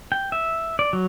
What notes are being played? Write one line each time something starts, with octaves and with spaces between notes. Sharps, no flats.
G5
E5
D5
F#3